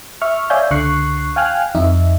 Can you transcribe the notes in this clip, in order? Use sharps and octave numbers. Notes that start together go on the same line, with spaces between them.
E5 C#6 F6
C#5 D5 E5 F5 G#5 G6
C#2 D3 C#6 F#6 C7
F5 G5 G#5 F6 F#6
F2 D#4 E5